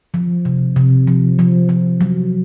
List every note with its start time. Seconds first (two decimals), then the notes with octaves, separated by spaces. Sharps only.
0.14 F3
0.45 C3
0.76 C3
1.07 F3
1.39 F3
1.69 F3
2.01 F#3